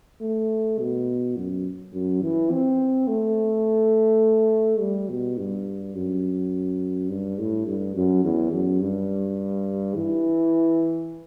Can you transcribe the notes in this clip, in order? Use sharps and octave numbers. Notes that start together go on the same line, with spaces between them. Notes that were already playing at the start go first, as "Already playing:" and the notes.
A3
B2
F#2
F#2
E3
C4
A3
G3
B2
G2
F#2
G2
A2
G2
F#2
E2
F#2
G2
E3